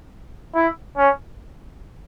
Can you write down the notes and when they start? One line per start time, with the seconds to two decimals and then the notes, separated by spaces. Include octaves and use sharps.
0.55 E4
0.97 C#4